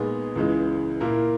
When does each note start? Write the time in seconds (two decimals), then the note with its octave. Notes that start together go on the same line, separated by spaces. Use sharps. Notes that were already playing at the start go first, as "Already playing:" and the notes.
Already playing: A#2 G#3 B3 D#4 G#4
0.36 C#2 C#3 E3 G#3
1.00 A#2 A#3 E4 A#4